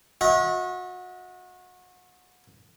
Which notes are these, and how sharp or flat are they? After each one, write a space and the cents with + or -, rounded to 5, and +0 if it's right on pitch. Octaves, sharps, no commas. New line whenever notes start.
F#4 -30 D#5 +45